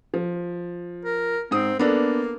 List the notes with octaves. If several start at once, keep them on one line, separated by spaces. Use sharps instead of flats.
F3
A#4
G#2 C4 D#6
A#3 B3 D4 A4